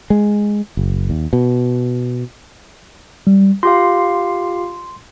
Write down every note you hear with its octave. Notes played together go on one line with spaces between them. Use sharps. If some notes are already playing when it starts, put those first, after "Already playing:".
G#3
F#1
D#2
B2
G3
F4 G4 F5 C6